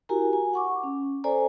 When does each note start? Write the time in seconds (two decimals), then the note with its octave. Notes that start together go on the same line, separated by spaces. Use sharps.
0.09 E4 F#4 G4 A#4 G#5 A#5
0.33 G#5
0.53 F#5 C#6 D6
0.83 C#4
1.24 A4 C5 D5 G#5 A#5